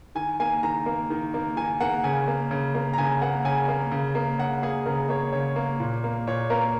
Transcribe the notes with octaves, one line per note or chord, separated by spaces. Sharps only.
D#3 G#5
A#3 G#5
D#3 A#5
A#3
D#3
A#3
D#3 G#5
A#3 F#5
C#3 G#5
A#3
C#3
A#3
A#5
C#3 G#5
A#3 F#5
C#3 G#5
A#3
C#3
A#3
C#3 F#5
A#3 G#4
C#3 A#4
A#3 C#5
C#3 C#5
A#3
A#2
A#3
A#2 C#5
A#3 A#4